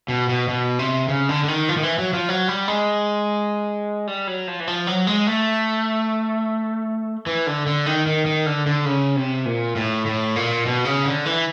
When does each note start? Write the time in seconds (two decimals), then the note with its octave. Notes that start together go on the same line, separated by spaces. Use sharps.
0.08 B2
0.29 B2
0.48 B2
0.79 C3
1.08 C#3
1.29 D3
1.44 D3
1.48 D#3
1.69 F3
1.77 D#3
1.83 E3
1.99 F#3
2.13 F3
2.29 F#3
2.48 G3
2.68 G#3
4.07 G3
4.27 F#3
4.48 F3
4.60 E3
4.67 F3
4.87 F#3
5.07 G#3
5.27 A3
7.26 E3
7.47 D3
7.66 D3
7.86 D#3
8.06 D#3
8.26 D#3
8.46 D3
8.66 D3
8.85 C#3
9.16 C3
9.46 A#2
9.76 A2
10.06 A2
10.36 A#2
10.66 B2
10.85 C#3
11.05 D3
11.26 E3